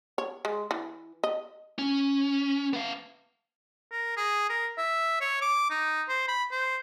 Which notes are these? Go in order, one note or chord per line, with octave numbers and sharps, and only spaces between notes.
C#5
G#3
E3
D#5
C#4
B3 F5
A#4
G#4
A#4
E5
C#5
D6
D#4
C5
B5
C5